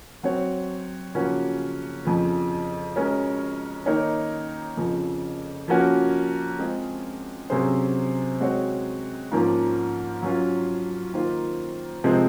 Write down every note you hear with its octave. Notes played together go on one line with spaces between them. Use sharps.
F#3 C4 F#4 C#5
C#3 F3 A#3 C#4 F#4
F2 C#3 F3
G#3 C#4 F#4 A#4 C#5
D#3 A#3 D#4 A#4 C#5
F2 C#3 F3
F3 A#3 C#4 F#4 A#4
G#3 C4 F4 G#4
C3 F#3 C#4 G#4 C5
G#3 C4 F#4 C#5
G#2 F3 A#3 C#4 F4
F#3 C#4 F4
D#3 A#3 F4 C5
C3 F3 G#3 C4